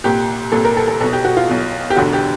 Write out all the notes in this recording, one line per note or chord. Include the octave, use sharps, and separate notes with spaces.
C2 A#2 G4
C2 A#2 A4
A#4
A4
A4
B1 B2 A4
G4
F#4
F4
B1 B2
G4
E1 D2 D3 F#4
G4